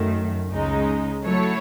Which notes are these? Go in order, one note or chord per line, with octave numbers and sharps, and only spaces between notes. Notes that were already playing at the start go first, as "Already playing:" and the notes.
Already playing: F#2 D#3 A3
C#2 C#3 G#3 D#4
F#3 A3 E4 A4 C#5